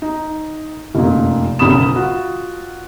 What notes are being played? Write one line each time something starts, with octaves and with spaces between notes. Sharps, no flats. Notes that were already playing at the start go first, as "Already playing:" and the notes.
D#4
F1 F#2 A#2
F#1 B1 F#2 B5 D#6 E7
F4 F#4